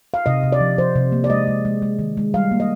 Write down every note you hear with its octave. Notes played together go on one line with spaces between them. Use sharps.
F5
C3 D#5
C3
D5
F3
F3 C5
C3
A#3
D5
G#3 D#5
G#3
G#3
G#3
D#3
G#3
G3 F5
A#3
D#5